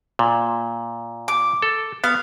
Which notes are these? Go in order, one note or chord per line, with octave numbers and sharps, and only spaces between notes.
A#2
D6
A4
B3 F5